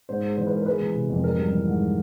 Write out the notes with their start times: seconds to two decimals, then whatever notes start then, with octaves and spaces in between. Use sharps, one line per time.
0.09 G#2 C5
0.24 G#3
0.37 E3 C5
0.47 B4
0.52 G#2 A#4
0.66 G#3 B4
0.80 E3
0.94 C3
1.10 F2
1.24 G#2 A#4
1.38 G3
1.52 E3
1.67 G#2